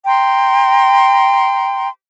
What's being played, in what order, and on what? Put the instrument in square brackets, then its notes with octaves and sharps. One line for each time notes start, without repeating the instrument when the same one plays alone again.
[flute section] G5 A#5 C6